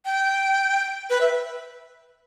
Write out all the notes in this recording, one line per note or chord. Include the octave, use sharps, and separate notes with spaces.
G5
B4
E5